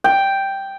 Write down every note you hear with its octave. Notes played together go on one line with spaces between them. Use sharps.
G5